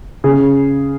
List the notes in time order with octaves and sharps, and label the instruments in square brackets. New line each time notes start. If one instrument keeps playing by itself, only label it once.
[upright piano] C#3 G#4